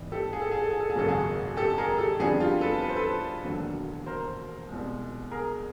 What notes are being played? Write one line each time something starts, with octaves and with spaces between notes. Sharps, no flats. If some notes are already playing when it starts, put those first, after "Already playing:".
Already playing: A1 G#2 E3 G3 B3
G4 A4
G#4
A4
G#4
A4
G#4
A4
G#4
G#1 F#2 C#3 F#3 A#3 A4
F#4 G#4
G4 A4
G#4 A#4
G4 A4
F2 D3 G3 B3 F#4 G#4
F4 G4
A4 B4
B4
C5
A4 B4
E1 D#2 D3 F#3
A#4 C5
C2 B2 G#3
G#4 A#4